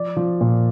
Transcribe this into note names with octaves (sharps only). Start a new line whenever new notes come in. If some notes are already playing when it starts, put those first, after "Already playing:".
Already playing: F3 D5
F3
A#2